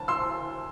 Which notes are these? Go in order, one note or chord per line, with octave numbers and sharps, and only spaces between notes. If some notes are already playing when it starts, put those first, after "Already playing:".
Already playing: D2 D3 F#3 A5
C6 E6